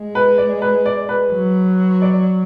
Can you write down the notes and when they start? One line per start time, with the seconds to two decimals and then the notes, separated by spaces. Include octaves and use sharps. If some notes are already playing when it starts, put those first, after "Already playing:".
Already playing: G#3
0.15 B4
0.38 D5
0.62 B4
0.86 D5
1.09 B4
1.32 F#3
2.02 D5